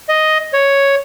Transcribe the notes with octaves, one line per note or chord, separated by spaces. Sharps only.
D#5
C#5